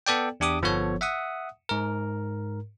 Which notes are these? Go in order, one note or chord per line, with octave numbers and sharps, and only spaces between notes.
B3 A4 D5 G5
E2 D4 G4 D6 D#6
G1 F3 B3 A4 C#5
E5 F#5 D#6
G#2 A#4